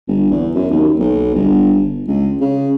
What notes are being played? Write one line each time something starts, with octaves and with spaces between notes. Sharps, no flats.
G1
E2
F#2
D#2
B1
G1
C#2
C#3